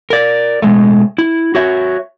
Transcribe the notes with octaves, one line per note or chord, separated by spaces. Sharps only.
A#4 D5
B2 G#3 A3
E4
F#4 C#5 E5